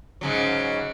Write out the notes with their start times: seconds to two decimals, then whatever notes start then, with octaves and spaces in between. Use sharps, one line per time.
0.21 G#2 C#3 F#3